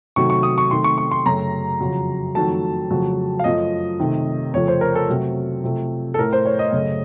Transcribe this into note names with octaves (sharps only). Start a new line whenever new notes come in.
C3 D#3 F#3 A3 C#6
C#6
D#6
C#6
C3 D#3 A3 C6
C#6
C#6
C6
F#2 C#3 A3 A#5
F2 C#3 F#3
F2 D#3 F#3 A3 A5
F2 C#3 F#3 A3
F5
F#2 F3 A3 D#5
C3 D#3 A3
F2 C#3 F3 A3 C#5
C5
A#4
A4
C3 F#3 A3
C3 F3 A3
A4
A2 A3 A#4
C5
C#5
D#5
F#2 C#3 A3